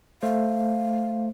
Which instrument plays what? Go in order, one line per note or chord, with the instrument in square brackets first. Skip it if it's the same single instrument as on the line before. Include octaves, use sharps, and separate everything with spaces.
[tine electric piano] A3 C5 [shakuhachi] F5